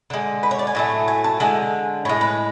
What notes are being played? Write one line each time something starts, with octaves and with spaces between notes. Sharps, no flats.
D3 G#3
B4
C#5
D5
G#5
A2 F#3 A3
G#5
A5
D3 G#3 G#5
A2 G#3 C#5
B4